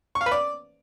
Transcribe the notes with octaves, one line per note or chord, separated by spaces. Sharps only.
C#6
F5
B4
D5